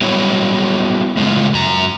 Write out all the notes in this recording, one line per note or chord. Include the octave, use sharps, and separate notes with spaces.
F#3 G3 B3 E4 C#5
F#2 A2 C#3 G#3 F4
F#2 A#5